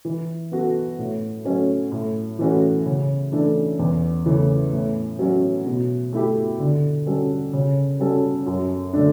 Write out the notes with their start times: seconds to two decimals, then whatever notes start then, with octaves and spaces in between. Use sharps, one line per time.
0.05 E3
0.51 B3 F#4 A4
0.98 A2
1.45 F#3 A3 C#4
1.92 A2
2.39 E3 A3 C#4 F#4
2.86 C#3
3.32 E3 A3 D4
3.79 E2
4.26 C#3 E3 A3
4.72 A2
5.19 F#3 C#4
5.66 B2
6.13 A3 E4 G4
6.60 D3
7.06 G3 C#4 F#4 A4
7.53 C#3
8.00 G3 C#4 F#4 A4
8.46 F#2
8.93 D3 A3 D4